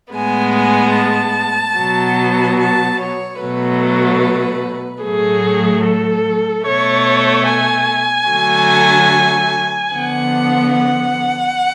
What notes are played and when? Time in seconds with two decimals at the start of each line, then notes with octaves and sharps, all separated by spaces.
0.12 A2 G#3 B3 G#5
0.54 G#5
0.95 A5
1.76 B2 F#3 B3
2.58 A5
2.98 C#5
3.39 B2 F#3 A3 B4
5.03 A2 F#3 A3 G#4
5.85 A4
6.66 B2 A3 C#5
7.48 G#5
8.30 D3 F#3 A3
9.92 D3 F3 B3 F#5
10.74 F#5